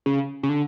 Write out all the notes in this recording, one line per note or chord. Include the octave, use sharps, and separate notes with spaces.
C#3
C#3
D3